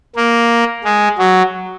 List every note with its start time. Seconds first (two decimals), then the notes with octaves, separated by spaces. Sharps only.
0.16 A#3
0.85 G#3
1.19 F#3